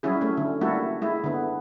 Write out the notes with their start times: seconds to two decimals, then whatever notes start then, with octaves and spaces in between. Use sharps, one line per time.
0.03 F#3 G3 C#4 E4 G#4
0.21 A3 C#4
0.37 D3
0.61 G3 A3 A#3 E4 F#4 A4
1.02 G#3 E4
1.24 D3 B3